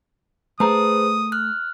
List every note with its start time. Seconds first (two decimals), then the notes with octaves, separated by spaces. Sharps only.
0.60 A3 G#4 B4 C5 A#5 D#6
1.32 F6 F#6